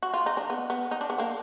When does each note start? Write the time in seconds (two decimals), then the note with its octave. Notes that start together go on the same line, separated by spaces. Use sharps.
0.03 F#4
0.14 F4
0.26 D#4
0.37 D4
0.50 B3
0.70 B3
0.91 D#4
1.01 D4
1.10 B3
1.18 A#3 D4